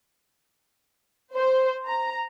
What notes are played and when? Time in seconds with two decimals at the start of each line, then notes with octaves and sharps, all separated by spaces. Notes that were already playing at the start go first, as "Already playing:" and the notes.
1.34 C5
1.86 A#5